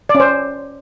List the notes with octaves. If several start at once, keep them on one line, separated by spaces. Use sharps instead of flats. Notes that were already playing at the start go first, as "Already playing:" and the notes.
D5
C#4
C5